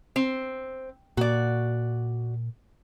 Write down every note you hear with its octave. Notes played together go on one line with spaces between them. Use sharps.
C4
A#2 F#4 D5